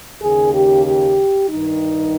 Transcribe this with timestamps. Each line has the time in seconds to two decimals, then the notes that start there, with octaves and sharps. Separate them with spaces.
0.21 D#2 C#3 G#4
0.54 G4
0.85 G4
1.49 G2 D#3 D#4